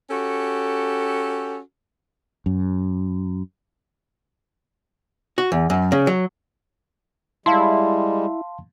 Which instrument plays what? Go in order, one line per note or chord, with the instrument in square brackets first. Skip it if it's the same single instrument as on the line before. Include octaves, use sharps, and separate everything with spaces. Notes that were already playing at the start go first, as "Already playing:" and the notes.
[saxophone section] C#4 F#4 G4 A4
[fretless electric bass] F#2
[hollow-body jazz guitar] F#4
E2
F#2
C#3
F#3
[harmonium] G3 G#3 [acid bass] E4 [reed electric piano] F5 A5 C6